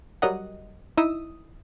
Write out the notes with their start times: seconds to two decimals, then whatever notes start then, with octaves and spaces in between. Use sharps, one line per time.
0.22 F#3 G3 A#4 D#5 F#5
0.97 D#4 E4 D#6 E6